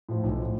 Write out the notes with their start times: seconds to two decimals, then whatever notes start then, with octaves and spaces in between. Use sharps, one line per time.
0.09 A2 F3
0.24 B1
0.39 A2 F3